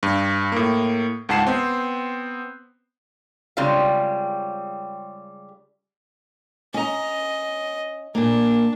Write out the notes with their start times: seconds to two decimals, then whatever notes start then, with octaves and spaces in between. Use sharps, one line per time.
0.03 G2
0.52 A2 A#3
1.29 C#2 G#2 F#5 A5 C7 E7
1.47 B3 C4
3.57 C#3 G3 G#3 C4 F4 F5
6.74 C#4 D#5 A#5
8.15 A#2 A#3 D4